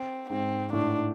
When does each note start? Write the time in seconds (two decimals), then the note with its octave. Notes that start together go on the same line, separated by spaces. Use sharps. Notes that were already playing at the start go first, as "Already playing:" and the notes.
Already playing: C4
0.30 G#2 C4
0.73 A2 D4